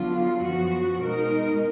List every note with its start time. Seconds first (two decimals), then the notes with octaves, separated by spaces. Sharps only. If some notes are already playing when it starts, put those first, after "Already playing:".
Already playing: D3 F#3 B3 F4
0.43 F#2 F3 B3 F#4
1.02 B2 G#3 D#4 A#4